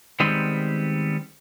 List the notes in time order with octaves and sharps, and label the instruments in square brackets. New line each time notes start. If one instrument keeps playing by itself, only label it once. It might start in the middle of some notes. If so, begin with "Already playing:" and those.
[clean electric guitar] D#3 G3 G#3 B3 C4